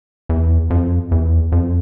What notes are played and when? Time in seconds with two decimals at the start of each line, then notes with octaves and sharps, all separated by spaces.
0.29 E2
0.70 F2
1.12 E2
1.52 F2